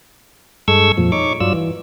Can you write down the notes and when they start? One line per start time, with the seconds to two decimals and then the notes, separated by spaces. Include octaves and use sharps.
0.68 G2 G#3 A4 C#6 E6 G#6
0.97 F2 A#2 F3
1.12 D#4 C#5 C#6 D6
1.40 G2 F#3 F4 D5 E6
1.53 E3